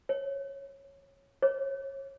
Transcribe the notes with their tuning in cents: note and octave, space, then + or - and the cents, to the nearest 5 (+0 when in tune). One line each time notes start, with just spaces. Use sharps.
C#5 -10
C#5 -25